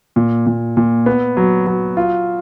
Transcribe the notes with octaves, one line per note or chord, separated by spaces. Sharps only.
A#2
A#2
A#2
B3
F#3
F#3
F4